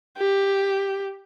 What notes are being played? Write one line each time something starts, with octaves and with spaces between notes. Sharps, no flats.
G4